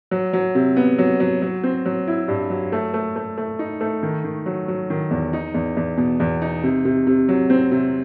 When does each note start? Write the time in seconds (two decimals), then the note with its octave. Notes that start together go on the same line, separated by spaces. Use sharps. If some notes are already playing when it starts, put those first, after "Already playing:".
0.11 F#3
0.33 F#3
0.55 C3
0.77 B3
0.98 F#3
1.20 F#3
1.42 F#3
1.64 C4
1.86 F#3
2.07 E4
2.28 G2
2.50 F#3
2.72 A3
2.94 A3
3.16 A3
3.37 A3
3.59 D#4
3.81 A3
4.03 D#3
4.24 D#3
4.46 F#3
4.68 F#3
4.90 D#3
5.11 E2
5.33 D#4
5.54 E2
5.77 E2
5.98 B2
6.20 E2
6.42 D#4
6.63 C3
6.85 C3
7.07 C3
7.28 F#3
7.50 C4
7.72 C3